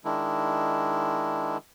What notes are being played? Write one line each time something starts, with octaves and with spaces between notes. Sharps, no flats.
D#3 G#3 D4 E4